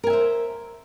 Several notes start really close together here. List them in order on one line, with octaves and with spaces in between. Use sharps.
A#4 G#5 E5 C5